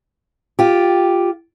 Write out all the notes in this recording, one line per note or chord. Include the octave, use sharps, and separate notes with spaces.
F4 G4